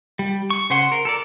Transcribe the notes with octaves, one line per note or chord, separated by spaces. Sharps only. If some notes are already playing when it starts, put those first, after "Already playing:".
G3
C#6
C#3 C5 F#5 C6
A#4
A4 A#4 D5